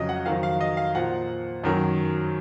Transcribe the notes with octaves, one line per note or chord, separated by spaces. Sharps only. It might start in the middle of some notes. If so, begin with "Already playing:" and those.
Already playing: F2 C#3 F#3 D#5
F#5
F2 D#3 F#3 F5
F5
D#5
F5
A#2 F3 F#5
F#2 D#3 F#3